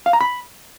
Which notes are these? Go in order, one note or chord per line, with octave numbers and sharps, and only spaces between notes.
F5
A#5
B5